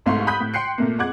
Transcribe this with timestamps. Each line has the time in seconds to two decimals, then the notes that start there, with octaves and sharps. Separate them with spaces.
0.06 C2 G#2 A3 F5 C6 C#6
0.27 B5 D#6 F#6 G6 B6
0.40 A2
0.54 G5 C6 F#6 C7 C#7
0.78 A#2 A3 A#3
0.98 F2 G#3 F#5 D6 F#6 G#6